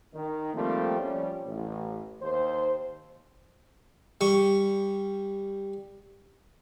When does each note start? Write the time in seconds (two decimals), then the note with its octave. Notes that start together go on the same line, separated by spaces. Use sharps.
0.13 D#3
0.54 F3 G3 A3 A#3 C4
0.99 F3 G3 C#4
1.45 A1
2.22 D#2 C5
4.21 G3 C#6